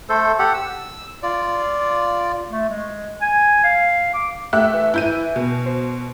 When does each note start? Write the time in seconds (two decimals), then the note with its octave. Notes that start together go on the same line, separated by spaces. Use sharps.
0.09 A3 A4 C5
0.39 G4 A4 F#5
0.54 E6
1.23 F4 D5
2.51 A3
2.69 G#3
3.21 G#5
3.64 F5
4.14 D6
4.53 A3 G4 E5 F#6
4.73 E3
4.94 E4 G6 D#7
5.36 B2
5.66 C5